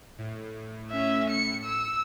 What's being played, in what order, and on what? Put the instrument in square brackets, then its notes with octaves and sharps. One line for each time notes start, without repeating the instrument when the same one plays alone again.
[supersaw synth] A2
[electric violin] C#4 E5
C#7
E6